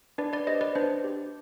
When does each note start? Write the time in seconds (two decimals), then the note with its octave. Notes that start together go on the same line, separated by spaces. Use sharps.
0.18 D4 B4 D5
0.33 B4 D5
0.47 G4 C5 D#5
0.61 B4 D5
0.75 D4 C5
1.04 G4